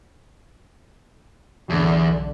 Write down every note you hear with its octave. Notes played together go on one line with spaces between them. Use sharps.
B1 E2 D3